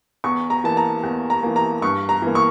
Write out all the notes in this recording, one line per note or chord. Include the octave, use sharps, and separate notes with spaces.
E2 C#6
A#5
E3 A#3 A5
A#5
E2
A#5
E3 A#3
A#5
G2 C#6
A#5
E3 A#3
C#6